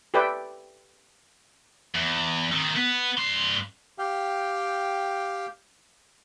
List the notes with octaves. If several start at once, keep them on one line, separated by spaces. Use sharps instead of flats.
G4 A4 B4 D5 E5 G5
E2
D#3 C4
B3
G2 C6
G4 F5 G5